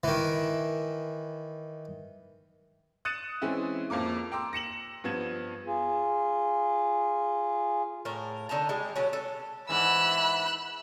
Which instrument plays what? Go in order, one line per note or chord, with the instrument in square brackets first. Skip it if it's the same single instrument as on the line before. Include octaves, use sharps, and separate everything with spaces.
[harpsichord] D#3 E3
[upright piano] D#6 F#6 A6 C#7 D#7 E7
E3 G#3 C4 C#4 E4
F2 A#3 A#4 D6
G5 A#5 C6 D6 E6
A#6 C#7 E7 F#7
G2 F3 B3 G#6 E7
[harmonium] F4 G#4
[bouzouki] A2 A#4
D3 D#4 A5 A#5
G3 G#3
B2 F#3 C#4 A#5
A4
[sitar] G#2 E3 [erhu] B5 [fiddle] E6 F#6